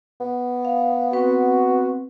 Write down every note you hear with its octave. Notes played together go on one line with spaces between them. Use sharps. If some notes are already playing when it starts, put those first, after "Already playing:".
B3
F5
C4 F#4 B4